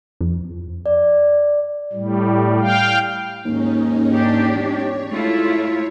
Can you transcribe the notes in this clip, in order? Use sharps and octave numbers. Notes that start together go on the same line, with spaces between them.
F2
D5
A2 G3
F5 G5
D#2 G#2 C#4 D#4
D4 G4
E1 C#5
G#2 A3 E4 F4